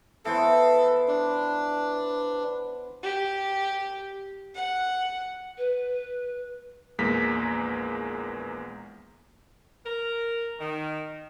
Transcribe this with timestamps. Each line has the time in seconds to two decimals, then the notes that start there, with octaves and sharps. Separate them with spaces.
0.25 E3 B3 A4 C5
1.08 D4
3.03 G4
4.55 F#5
5.57 B4
6.99 A#1 E2 G#3 A#3 A#5 B6
9.86 A#4
10.59 D#3